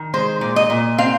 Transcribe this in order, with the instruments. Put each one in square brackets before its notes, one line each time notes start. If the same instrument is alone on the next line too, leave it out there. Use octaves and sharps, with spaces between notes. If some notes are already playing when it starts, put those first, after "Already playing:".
Already playing: [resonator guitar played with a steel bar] D#3
G#3 C5
A#2
D#5
A#2
C4 F5